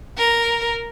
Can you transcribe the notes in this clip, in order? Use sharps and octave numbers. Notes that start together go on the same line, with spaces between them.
A#4